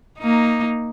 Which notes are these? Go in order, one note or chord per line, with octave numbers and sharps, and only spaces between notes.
A#3 D#4